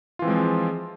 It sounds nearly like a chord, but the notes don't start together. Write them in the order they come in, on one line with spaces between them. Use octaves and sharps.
F4 E3 C4 G#3 F3